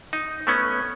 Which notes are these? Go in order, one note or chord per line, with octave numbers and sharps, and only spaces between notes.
D#4
A3 B3 C#4